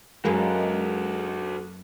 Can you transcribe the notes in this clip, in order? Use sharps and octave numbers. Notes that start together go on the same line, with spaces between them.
F#2 G#3 A#3 F#4 A4 B4